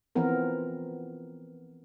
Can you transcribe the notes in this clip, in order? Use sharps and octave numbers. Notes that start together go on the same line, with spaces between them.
E3 F3 B3 C4 A#4